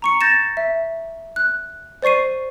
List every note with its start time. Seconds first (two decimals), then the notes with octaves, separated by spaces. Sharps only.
0.02 A#5 C#6 C#7
0.21 G6 A6 A#6 E7
0.57 E5
1.36 F#6
2.02 C5 D5 C#6 C7 D#7